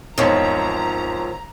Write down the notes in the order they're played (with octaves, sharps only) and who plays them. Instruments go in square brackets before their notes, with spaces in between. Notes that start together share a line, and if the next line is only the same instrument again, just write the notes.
[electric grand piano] G#1 E2 C#5 [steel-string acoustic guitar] D#3 F3 [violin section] A#5